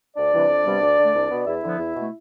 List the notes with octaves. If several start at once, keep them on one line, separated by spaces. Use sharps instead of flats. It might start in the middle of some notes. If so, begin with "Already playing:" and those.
D2 D4 D5
C3 E3 G3
F2
C3 G3 B3
D2
D3 A3
C2
B2 B3
E2 E4 E5
D3 F3 B3
E2
B2 A3